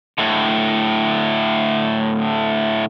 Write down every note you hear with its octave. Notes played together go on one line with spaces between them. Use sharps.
A2 D3